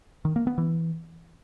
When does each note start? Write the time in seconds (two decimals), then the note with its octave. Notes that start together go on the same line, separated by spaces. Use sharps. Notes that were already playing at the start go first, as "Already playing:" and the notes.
0.25 D#3
0.36 A#3
0.47 B3
0.58 E3